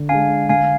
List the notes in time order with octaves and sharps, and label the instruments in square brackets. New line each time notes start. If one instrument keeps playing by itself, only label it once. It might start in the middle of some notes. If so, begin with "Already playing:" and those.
Already playing: [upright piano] D3
[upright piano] G#3 D4 [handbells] F5 G#5
[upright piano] D3 [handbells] F5 G#5